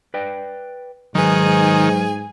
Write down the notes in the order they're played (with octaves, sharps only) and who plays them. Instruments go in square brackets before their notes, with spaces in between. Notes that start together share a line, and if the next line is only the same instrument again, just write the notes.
[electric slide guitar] B4 D5 G5
[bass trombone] G#2 [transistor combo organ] D#3 [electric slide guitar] F#3 B4 [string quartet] G#4 G#5